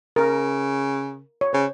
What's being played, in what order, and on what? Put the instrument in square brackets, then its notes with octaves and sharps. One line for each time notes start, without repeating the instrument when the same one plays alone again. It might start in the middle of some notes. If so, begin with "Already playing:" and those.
[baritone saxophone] C#3 [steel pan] A#4
[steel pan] C#5
[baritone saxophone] C#3 [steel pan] C5